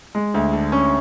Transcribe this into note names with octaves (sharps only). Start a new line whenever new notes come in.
G#3
D2
D3
C#4